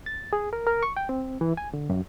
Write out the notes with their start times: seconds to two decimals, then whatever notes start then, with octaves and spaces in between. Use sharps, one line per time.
0.06 A6
0.33 G#4
0.53 A#4
0.67 A#4
0.83 C#6
0.97 G5
1.09 C4
1.41 E3
1.57 G#5
1.74 D3
1.90 F#2